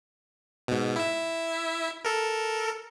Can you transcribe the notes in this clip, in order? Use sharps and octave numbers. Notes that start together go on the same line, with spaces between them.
G#2 B2
E4 E5
A4 A#4